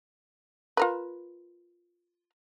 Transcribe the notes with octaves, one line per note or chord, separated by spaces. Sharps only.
F4 A#4 B4